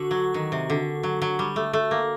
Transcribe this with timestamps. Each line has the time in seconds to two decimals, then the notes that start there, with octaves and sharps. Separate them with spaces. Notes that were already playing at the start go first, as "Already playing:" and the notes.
Already playing: D3 F#4
0.11 F#3
0.34 D#3
0.52 C3
0.70 D3
1.03 F#3
1.22 F#3
1.39 G3
1.56 A3
1.73 A3
1.91 A#3